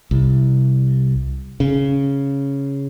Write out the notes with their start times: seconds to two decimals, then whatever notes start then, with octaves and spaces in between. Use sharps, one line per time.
0.11 C2
1.60 C#3